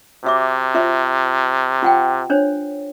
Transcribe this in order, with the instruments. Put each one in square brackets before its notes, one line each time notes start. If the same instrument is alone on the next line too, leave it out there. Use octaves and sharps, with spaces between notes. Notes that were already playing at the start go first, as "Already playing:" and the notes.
[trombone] C3 [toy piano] F#4 E5 D6
[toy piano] F4 C5 E5
F4 F#5 G5
D4 C5 C#5